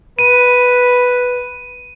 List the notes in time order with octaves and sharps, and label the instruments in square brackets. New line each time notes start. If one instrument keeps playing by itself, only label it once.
[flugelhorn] B4 [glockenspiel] D#7